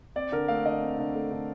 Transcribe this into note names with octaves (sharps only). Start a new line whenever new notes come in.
C4 D5
D3 A#4
A3 F5
D3 D#5
C4
D3
A3
D3